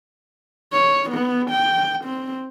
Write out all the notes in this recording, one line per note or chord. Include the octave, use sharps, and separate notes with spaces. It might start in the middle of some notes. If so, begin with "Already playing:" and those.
C#5
B3
G5
C4